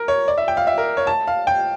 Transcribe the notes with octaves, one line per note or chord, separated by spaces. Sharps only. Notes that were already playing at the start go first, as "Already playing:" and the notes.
Already playing: A#4
C#5
D5
E5
G5
F5
E5
A#4
C#5
A5
F5
G5